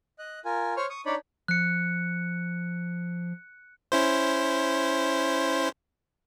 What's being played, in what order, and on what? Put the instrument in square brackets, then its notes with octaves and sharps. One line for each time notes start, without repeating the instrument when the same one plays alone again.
[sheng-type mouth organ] D#5 F#6
F4 A#4 G#5
C5 C#5 C#6 F6
C#6 D#6
D4 D#4 C#5 D5 B5
[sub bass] F3 [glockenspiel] F#6 C#7
[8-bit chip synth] C#4 E4 C5